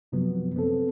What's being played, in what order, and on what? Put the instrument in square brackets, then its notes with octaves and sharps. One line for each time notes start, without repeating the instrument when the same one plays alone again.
[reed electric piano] F#2 C3 F3 F#3 B3
B3 C4 A4